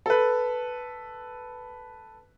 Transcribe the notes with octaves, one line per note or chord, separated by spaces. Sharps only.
A4 B4